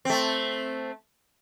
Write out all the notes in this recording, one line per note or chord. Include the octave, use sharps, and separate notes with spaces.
A3 C4